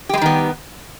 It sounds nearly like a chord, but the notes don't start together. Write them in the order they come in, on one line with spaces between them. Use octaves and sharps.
G4 G#3 G3 D#3 B3